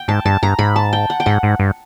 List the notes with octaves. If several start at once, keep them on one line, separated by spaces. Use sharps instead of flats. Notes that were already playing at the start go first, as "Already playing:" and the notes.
Already playing: G5
G#2 A5
G2 A5
G2 A#5
G#2 B5
A5
G5
F#5
G5
G#2 F#5
G#2
G2